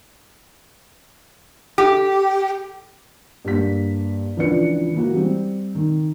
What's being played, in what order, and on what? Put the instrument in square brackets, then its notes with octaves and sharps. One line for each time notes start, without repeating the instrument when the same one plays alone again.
[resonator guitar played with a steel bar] G4
[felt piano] G2 G3 A#3 B6
C#2 E3 F3 D4 B4 C#7
E3 A#3 F#4
G3 C4
D#3